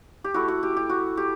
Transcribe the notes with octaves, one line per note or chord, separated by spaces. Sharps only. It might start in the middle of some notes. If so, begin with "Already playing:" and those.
G4
A3 E4 F#4
F#4
G4
G4
F#4
G4